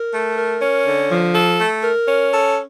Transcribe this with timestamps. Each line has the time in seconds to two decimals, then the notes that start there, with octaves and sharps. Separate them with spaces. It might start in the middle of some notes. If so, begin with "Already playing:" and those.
Already playing: A#4
0.13 A3
0.37 A#4
0.62 C#4
0.86 D3
1.11 F3
1.35 A4
1.60 A3
1.84 A#4
2.08 C#4
2.33 A4